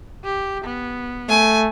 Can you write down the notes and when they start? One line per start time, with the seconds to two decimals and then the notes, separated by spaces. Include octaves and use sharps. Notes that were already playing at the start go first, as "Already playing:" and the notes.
0.24 G4
0.64 B3
1.29 A3 G#5